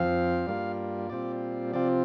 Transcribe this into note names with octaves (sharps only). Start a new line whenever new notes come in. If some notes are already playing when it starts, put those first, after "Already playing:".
Already playing: F2 F3 C4 F5
G2 G3 A#3 F4
A#2 G3 C4 F4 D5
C3 F3 C4 F4 D5